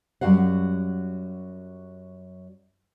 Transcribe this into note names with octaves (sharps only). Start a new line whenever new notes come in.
F#2 G3 F#4 F5 F#5